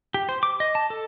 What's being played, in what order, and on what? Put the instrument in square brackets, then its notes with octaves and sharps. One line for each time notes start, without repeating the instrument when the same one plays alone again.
[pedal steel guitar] G4
C5
D6
D#5
A5
A4